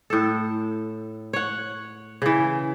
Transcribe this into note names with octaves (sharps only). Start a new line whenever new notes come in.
A2 A4
C#5 F#5
C#3 E3